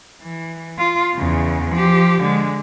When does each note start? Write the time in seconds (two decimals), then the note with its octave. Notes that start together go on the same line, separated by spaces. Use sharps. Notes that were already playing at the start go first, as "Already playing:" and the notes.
0.22 E3
0.78 F4
1.15 E2 C#3
1.71 F3 G4
2.20 D3 G#3